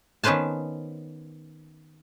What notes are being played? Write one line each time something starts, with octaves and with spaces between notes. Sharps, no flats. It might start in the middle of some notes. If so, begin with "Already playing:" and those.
D#3 B3 C#4 B4 C5 A5